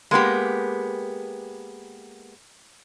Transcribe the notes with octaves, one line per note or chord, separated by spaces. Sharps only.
G#3 A#3 B3 G4